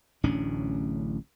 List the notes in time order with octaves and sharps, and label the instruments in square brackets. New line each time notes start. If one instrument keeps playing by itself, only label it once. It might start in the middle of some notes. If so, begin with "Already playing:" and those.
[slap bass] D1 A1 C#4 D4